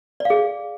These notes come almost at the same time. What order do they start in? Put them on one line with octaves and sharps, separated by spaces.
D5 F5 G#4